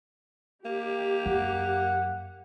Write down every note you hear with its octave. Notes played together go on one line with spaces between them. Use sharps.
A#3 G4
F#2 F#5